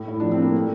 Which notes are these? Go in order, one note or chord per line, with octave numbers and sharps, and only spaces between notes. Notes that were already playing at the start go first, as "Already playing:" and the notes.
Already playing: A2
E4
F3 D4
C4
A#3
A3